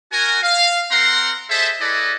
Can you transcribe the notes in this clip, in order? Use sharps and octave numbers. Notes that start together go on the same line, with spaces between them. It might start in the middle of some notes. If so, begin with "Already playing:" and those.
F#4 A#4 G#5
F5
C4 A#4 F#5 A#5 C6
G#4 A4 C5 D#5 E5
E4 G#4 A4 B4 D5 D#5